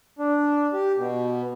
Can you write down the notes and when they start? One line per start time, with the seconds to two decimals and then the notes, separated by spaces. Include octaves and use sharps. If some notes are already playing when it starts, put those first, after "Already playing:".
0.19 D4
0.73 G4
0.97 B2